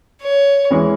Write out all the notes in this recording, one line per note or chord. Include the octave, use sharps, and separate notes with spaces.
C#5
E3 G#3 C#4